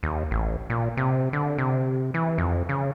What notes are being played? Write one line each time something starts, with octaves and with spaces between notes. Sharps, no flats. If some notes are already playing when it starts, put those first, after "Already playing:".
D#2
A1
A#2
C3
D3
C3
E3
F2
C#3